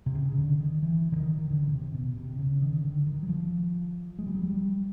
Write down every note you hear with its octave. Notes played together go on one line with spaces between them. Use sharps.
C3
C#3
C#3
D3
D#3
E3
D3
D#3
D#3
D3
B2
C3
B2
C3
C#3
D#3
D3
D#3
F#3
F3
G#3
G3
F#3
G3